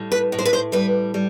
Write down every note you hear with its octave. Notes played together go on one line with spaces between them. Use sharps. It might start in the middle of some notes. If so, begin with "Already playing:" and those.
Already playing: A2 G3
B4
A2
C5
B4
C5
G3 B4
G3